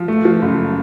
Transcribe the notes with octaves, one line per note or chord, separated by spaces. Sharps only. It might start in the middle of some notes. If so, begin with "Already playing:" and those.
Already playing: F3
A3
F3
F#1